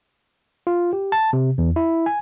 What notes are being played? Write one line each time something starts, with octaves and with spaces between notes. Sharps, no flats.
F4
G4
A5
C3
E2
E4
G#5